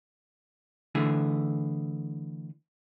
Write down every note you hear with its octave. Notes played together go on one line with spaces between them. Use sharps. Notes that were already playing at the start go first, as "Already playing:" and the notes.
D3 E3 A3 G#4